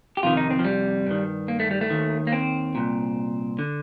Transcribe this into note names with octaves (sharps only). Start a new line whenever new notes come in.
G4
F2 C3 D#3 F4
D#4
C4
F3
G3
G2 D#3
A#3
A3
G3
A3
D#2 D#3
A#3
C4
C2 A#2
D3